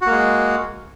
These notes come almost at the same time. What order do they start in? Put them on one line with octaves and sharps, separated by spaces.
F#4 A#3 G#3